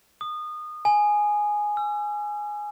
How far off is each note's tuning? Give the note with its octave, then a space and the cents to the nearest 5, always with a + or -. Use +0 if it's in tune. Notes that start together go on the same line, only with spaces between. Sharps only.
D#6 -25
G#5 +5
E6 +40